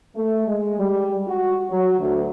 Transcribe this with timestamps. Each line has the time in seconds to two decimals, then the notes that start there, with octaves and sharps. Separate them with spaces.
0.16 A3
0.47 G#3
0.79 G3
1.27 F#4
1.70 F#3
2.00 D2